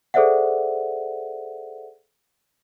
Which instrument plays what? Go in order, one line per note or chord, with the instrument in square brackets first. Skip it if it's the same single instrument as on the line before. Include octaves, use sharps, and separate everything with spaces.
[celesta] G#4 A4 C5 D5 E5 F#5